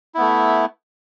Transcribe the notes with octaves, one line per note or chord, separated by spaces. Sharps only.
A3 B3 E4